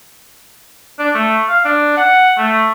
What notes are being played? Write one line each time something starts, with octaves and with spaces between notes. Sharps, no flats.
D4
A3
F5
D4
F#5
A3